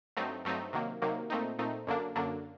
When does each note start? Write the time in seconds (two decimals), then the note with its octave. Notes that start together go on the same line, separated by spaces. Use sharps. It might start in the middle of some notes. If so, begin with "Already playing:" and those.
0.17 G2 F#3 A3 C4 D#4
0.45 G2 F#3 A3 C4 D#4
0.73 C3 D#3 F#3 A#3
1.02 C3 D#3 F#3 A#3
1.30 A#2 A3 C4 D#4
1.59 A#2 A3 C4 D#4
1.87 F#2 D3 F#3 A#3 D4
2.16 F#2 D3 F#3 A#3 D4